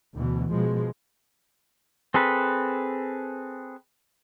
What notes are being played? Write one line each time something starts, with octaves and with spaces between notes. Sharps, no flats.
D2 B2 E3
B2 F3 G#3
C4 G#4 A4 B4